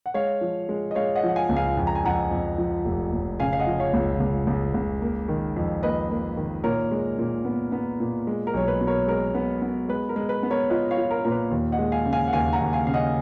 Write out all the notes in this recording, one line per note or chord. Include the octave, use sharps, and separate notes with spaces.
F#5
G#3 C#5 F5
F3
G#3
D#5
G#3 C#5 F5
D#5 F#5
F3
F#5
F5 G#5
C#2
F5 G#5
F2
A#5
G#5
F2 F#5 A#5
F2
F3
F1
F1
C#3 F5 G#5
F5
D#5 F#5
F3
C#5 F5
C#2
C#2
C#2
C#2
A#3
D#3
F2
A#3 B4 D#5
A#3
D#3
A#2 A#4 C#5
G#3
A#2
B3
B3
A#2
G#3
A#4
B1 C#5
B4
B2
A#4 C#5
G#3 A#4
B3
B3
G#3 B4
A#4
G#3
B4
B3
A#4 C#5
F4 B4 D#5
C#5 F5
F4
A#4
A#2 A#4
B4
D#2
D#5 F#5
G#3
F5 G#5
C#3
F5 G#5
F#5
D#2 F5 G#5
F#5 A#5
D#2
F5 G#5
C#3 F5
D#5 F#5